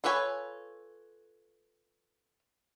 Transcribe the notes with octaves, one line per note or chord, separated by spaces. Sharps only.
F4 A4 B4 C#5 G#5